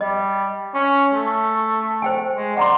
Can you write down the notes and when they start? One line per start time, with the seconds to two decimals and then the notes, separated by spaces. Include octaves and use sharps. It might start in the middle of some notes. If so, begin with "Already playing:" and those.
0.01 G3 D#5
0.74 C#4
1.13 A3
2.02 C5 G5 G#5
2.36 G#3
2.57 D5 F#5 A#5 C6